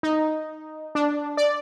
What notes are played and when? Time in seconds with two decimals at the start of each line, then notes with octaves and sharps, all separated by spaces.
0.03 D#4
0.95 D4
1.37 D5